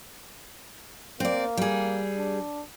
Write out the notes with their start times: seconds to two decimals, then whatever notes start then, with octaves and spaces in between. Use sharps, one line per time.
1.20 A#3 C4 D5
1.57 G3 G#4
2.16 D4